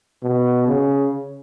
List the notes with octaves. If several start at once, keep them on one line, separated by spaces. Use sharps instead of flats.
B2
C#3